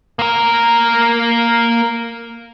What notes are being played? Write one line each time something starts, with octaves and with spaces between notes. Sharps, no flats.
A#3 A#4